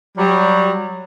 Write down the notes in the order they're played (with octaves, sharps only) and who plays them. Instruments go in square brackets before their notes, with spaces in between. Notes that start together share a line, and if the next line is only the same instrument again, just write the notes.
[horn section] F#3 G3